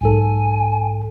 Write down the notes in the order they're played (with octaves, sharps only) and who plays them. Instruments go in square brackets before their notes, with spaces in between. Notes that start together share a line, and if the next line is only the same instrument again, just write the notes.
[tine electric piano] B1 G#2 A4 [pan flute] G#5